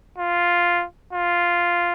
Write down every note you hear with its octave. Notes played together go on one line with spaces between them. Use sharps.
F4
F4